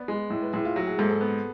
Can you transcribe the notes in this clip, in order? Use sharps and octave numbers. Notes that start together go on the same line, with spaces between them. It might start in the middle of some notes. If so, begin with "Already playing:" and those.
Already playing: B3 D5
G#3
A2
B4
A2 G#4
F4
F#3 F#4
G#4
G#2 A4
A4
B3